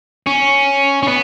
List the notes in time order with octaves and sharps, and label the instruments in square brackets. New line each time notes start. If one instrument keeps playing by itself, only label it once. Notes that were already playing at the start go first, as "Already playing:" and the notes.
[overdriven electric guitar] C#4
C#4
B3